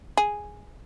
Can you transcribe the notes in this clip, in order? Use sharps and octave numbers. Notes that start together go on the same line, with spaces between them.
G#4